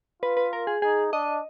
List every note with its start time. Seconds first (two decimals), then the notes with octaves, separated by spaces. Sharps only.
0.22 F4 B4
0.37 B4
0.53 A#4
0.67 G#4
0.82 D#4 G#4
1.12 D4 D#5